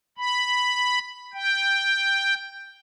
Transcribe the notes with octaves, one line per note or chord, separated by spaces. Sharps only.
B5
G5